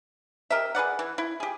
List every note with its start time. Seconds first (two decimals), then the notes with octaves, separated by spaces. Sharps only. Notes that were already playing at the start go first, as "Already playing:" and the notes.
0.50 G4 A#4 D#5 E5
0.75 G#4 B4 D5 F#5
0.99 E3
1.18 E4
1.40 G4 G#4